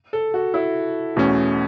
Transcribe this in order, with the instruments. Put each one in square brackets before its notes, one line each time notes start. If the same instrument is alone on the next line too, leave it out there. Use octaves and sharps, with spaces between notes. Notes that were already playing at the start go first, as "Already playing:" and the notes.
[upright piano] A4
F#4
E4
[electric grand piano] E2 B2 A3 C#4 [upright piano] F#4